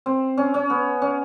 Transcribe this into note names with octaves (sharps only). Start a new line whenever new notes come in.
C4
C#4
C#4
B3
C#4